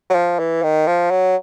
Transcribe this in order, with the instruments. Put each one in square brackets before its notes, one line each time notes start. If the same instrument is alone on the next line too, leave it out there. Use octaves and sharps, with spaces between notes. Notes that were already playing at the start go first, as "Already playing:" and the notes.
[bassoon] F#3
F3
E3
D#3
F3
F#3